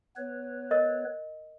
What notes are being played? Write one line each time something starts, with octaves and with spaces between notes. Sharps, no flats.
B3 B4 C#5
A#4 D#5